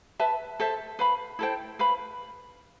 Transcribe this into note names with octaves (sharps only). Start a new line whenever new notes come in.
B4 E5 A5
A4 C5 E5
B4 F5 B5
E4 A4 C5 G5
B4 F5 B5